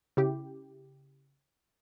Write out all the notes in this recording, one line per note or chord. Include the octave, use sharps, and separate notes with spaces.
C#3 E4 G4